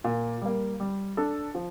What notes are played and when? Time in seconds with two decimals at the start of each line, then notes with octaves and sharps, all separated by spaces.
0.04 A#2
0.41 G3 A#3
0.80 G3
1.17 D4 A4
1.55 F3